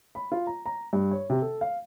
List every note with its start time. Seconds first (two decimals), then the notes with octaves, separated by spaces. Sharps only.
0.15 B5
0.32 F4
0.47 A#5
0.66 A#5
0.93 G2
1.11 C#5
1.30 C3
1.42 A4
1.61 F5